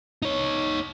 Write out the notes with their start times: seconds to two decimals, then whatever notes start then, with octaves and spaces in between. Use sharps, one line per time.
0.22 D#4 C#5